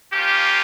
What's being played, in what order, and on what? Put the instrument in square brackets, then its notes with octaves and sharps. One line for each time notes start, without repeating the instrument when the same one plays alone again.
[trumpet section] A#3 C#4 F4 G4